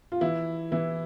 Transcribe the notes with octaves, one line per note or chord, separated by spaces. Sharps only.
F4
E3 E4
E3 E4